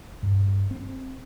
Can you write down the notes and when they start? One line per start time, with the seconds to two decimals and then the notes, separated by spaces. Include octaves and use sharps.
0.23 G2
0.71 C4